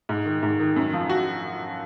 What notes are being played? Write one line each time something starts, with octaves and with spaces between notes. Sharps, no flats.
G#2
D#3
G#2
D#3
F#2
F3
F#4